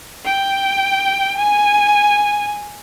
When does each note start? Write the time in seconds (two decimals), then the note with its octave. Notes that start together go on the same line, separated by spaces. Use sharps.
0.25 G5
1.37 G#5